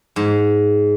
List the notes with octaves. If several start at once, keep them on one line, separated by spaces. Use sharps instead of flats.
G#2